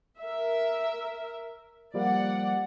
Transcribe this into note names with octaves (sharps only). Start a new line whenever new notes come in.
A#4 E5
F3 G3 A#3 D5 F#5